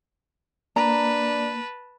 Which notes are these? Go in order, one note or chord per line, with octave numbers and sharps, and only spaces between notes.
A#3 D4 B4 A5 A#5